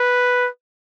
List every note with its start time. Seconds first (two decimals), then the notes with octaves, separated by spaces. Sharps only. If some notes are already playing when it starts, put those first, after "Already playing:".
Already playing: B4